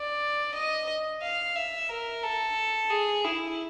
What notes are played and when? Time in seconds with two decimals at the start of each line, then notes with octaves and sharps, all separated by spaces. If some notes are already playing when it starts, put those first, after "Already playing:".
Already playing: D5
0.54 D#5
1.22 F5
1.56 E5
1.90 A#4
2.23 A4
2.90 G#4
3.24 E4